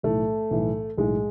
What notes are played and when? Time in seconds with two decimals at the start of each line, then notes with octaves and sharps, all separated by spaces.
0.03 B1 A2 E3 A3
0.51 B1 A2 E3
0.97 B1 A2 E3 G#3